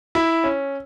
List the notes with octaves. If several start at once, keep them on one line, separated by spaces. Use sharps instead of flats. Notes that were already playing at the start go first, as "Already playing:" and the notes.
E4
C#4